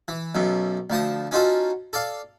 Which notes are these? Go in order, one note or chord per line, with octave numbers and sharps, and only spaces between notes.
E3
B1 F#2 B2
D2 F3 A5 D#6
C#4 D#4 F4 F#4 A4
A4 D5 F5